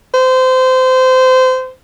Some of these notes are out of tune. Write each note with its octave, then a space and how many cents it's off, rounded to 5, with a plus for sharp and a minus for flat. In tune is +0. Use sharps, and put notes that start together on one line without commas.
C5 -25